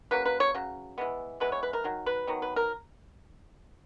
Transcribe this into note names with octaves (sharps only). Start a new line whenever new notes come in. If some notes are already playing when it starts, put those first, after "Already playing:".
C#3 F#3 A#3 B4
B4
C#5
C#3 F#3
E3 G#3 B3
E3 G#3 B3 B4
C#5
B4
A#4
D#3 F#3
B4
D#3 F#3 B3
B4
A#4